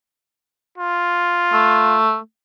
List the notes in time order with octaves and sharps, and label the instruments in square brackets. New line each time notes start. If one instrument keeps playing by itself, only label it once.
[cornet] F4
[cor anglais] A3